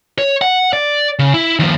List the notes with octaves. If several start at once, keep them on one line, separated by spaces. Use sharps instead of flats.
C#5
F#5
D5
C#3
E4
D#2 F3